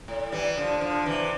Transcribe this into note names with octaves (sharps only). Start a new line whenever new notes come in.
A2
E3 G3
D3 F3
D3 F3
C3 E3